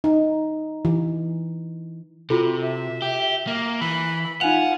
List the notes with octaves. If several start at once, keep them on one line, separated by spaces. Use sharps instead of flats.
D#4
E3
C3 F4 F#4 A4
E5
G4
A#3
E3 B5
D#4 F4 F#5 G#5 F7